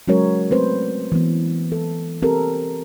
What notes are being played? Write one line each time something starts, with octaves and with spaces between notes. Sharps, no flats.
F#3 G#3 C#4 F#4 A#4 C#5
A3 C4 B4 C5
E3 B3
A4
C4 G4 A4 A#4